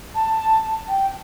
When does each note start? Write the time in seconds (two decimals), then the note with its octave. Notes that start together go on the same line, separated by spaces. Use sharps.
0.15 A5
0.88 G5